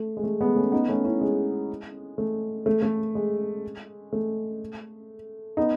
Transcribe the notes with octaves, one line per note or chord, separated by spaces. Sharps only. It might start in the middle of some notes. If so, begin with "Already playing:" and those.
Already playing: A3
G#3
A3
G#3 B3
A3 C#4
B3 D#4
A3 C#4
C#4 E4
G#3
A3
A3
A3
G#3
A3
B3 D#4